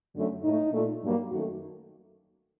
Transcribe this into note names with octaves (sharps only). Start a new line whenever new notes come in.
F#2 D3 F#3 A3
A2 A3 D#4
A#2 A3
G2 F#3 A#3
F#2 D#3 A3 F#4